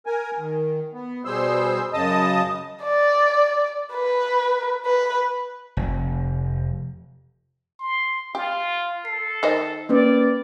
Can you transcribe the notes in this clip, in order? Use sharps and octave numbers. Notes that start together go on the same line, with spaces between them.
A#4 G#5
D#3
B3
B2 G3 G#4 C5 C6 E6
F#2 C#3 D#5 A5 D#6
D5
B4
B4
F1
C6
F4 G4
A4 C7
D#3 C5 D#5
A#3 C#4 B4 D5